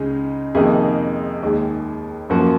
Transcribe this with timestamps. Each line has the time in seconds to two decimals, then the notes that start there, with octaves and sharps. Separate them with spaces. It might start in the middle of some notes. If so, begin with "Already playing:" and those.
Already playing: C#2 C#3 G#3 D#4
0.55 F2 C3 D#3 A#3 D#4 G#4
1.43 D#2 D#3 G#3 G#4
2.30 F#2 F3 A#3 F#4